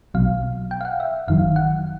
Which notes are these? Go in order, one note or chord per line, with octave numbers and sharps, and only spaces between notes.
B1 B2 F#3 F5
G5
F5
F#5
E5
G1 F#2 D#3 F#3 F5
F#5